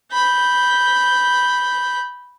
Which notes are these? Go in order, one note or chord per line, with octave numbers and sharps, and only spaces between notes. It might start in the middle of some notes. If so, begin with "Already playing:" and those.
B5 G6